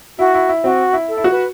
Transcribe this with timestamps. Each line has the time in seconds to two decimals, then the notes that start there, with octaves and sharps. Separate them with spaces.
0.19 E4 F#4
0.34 E4
0.49 E4
0.64 C4 F#4
0.93 E4
1.09 A4
1.17 E4
1.24 F#4
1.31 B4